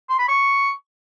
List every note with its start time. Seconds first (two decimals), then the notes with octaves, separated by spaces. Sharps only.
0.09 C6
0.19 B5
0.28 C#6